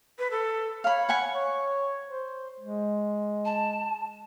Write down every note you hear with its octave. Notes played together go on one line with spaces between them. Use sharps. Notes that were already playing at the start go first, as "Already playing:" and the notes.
B4
A4
C#5 F5 B5
F#5 G#5 B5
C#5
C5
G#3
A5